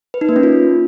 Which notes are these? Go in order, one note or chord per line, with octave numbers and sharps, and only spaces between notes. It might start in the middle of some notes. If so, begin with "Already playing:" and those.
B4
D#4
A#3
C#4
F4